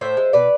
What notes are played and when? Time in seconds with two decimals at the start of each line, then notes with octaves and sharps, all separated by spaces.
0.01 A2 C5 E5
0.17 G#3
0.33 B2 B4 D5